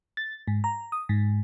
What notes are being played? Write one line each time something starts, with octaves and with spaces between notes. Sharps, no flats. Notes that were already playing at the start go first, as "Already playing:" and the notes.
A6
G#2
A#5
D#6
G#2